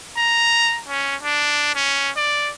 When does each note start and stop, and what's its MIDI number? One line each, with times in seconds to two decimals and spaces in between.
0.17 0.80 82
0.88 1.16 61
1.23 1.72 62
1.75 2.11 61
2.16 2.52 74